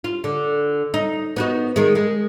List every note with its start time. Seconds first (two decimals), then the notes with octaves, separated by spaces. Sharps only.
0.04 F4
0.24 D3
0.94 D#4
1.36 B3 D#4 F#4
1.76 D#3 G#3
1.95 G#3